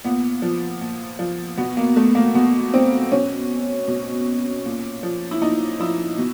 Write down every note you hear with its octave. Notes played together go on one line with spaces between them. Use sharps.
A#2 B3
F3
A#2
F3
B2 B3
A#3
A3
A#3
B2 B3
C4
B2 C#4
B2
A#2
F3
E4
A#2 D#4
F3 E4
B2